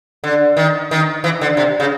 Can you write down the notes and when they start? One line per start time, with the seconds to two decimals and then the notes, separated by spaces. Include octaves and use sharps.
0.24 D3
0.57 D#3
0.91 D#3
1.24 E3
1.41 D3
1.57 C3
1.80 C#3